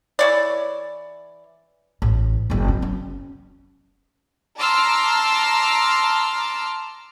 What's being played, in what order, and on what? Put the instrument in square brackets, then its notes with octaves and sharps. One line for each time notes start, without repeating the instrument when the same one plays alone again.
[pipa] E3 C#5 D5
[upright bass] A1
F#1 F#2
C4
C#4
[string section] A5 A#5 C6 D6 E6 F6